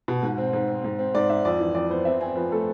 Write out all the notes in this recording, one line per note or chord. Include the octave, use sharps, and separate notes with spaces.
B2
G#2
C4
G#2
C4
G#2
C4
G#2 D5
G#2 E5
F2 D5
E3
F2 D5
B3 C5
C4 E5
C4 G#5
F3 B4
A3 A4